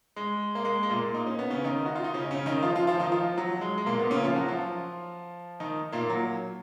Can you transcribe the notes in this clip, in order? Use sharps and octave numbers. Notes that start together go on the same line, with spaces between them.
G#3
A#3
G#3
G#3
A#2 A#3
D#4
C#4
B3
C#3 C#4
D#3 D#4
F#4
F4
D#4
C#3 C#4
C#3 C#4
D#3 D#4
F3 F4
F3 F4
F3 F4
D#3 D#4
F3 F4
F#3
G#3
G#3
A#2 A#3
B3
C#3 C#4
F3 F4
F#3 F#4
F3 F4
D#3 D#4
A#2 A#3
F#3